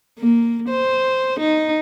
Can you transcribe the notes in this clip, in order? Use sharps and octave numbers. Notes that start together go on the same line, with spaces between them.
A#3
C5
D#4